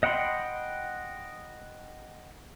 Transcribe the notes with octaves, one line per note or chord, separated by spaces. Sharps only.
D#5 F#5 G5 B5 C6